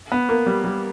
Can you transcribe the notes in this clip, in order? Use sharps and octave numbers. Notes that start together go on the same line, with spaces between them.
B3
A#3
G3
G3